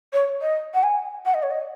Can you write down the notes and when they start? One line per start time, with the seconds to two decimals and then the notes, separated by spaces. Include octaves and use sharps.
0.13 C#5
0.41 D#5
0.74 F#5
0.83 G#5
1.25 F#5
1.34 D#5
1.43 C#5
1.51 D#5